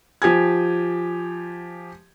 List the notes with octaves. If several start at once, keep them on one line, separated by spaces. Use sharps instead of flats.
F3 G4 G#5 G#6